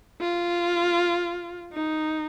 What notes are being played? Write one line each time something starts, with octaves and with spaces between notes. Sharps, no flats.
F4
D#4